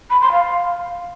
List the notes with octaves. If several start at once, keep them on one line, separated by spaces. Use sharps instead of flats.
B5
C6
F5